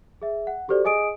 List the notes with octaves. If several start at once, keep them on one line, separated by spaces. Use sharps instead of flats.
G#4 E5
F#5
F#4 G4 A4 C5 D5
G#4 D#5 G#5 D#6 D7